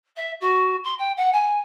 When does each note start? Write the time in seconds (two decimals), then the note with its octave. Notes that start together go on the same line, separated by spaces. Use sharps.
0.16 E5
0.41 F#4
0.84 C6
0.98 G5
1.17 F#5
1.32 G#5